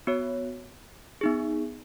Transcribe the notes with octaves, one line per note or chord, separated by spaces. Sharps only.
B3 F#4 C#5
B3 D#4 G#4